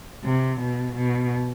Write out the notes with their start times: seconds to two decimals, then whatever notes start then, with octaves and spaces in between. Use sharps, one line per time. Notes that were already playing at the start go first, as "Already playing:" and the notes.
0.25 C3
0.61 B2
0.96 B2